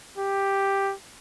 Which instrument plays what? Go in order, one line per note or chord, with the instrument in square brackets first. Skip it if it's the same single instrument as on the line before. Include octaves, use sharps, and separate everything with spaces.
[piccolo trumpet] G4